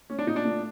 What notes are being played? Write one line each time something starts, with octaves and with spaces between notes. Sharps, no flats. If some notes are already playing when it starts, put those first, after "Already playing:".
A3 C#4
D4
A#2 D#4
D4
A3